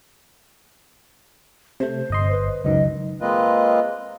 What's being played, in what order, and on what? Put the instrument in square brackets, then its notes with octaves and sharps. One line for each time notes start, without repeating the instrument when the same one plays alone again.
[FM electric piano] C3 A3 [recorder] C5
[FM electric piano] G1 D#5 C6
[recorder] B4
[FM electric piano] C#2 F#2 D#3 [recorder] D#5
[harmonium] G#3 A#3 C4 F4 B4 D#5